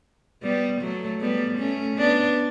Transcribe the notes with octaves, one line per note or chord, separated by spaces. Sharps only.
G3 B3
F#3 A3
G3 B3
A3 C#4
B3 D4